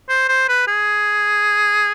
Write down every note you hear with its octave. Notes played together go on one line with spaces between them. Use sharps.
C5
C5
B4
G#4